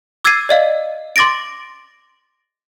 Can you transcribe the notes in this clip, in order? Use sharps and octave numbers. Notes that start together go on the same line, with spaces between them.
D6 E6 G#6 A6 C7 D#7
D5 D#5 F5
C6 D6 A6 A#6 D7